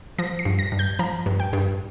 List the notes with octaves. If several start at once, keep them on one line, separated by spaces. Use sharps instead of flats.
F3 A#6
C7
G2
A#6
G2
G6
F3 A#5
G2
G5
G2